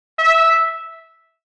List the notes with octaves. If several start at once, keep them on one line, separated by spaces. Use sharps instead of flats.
E5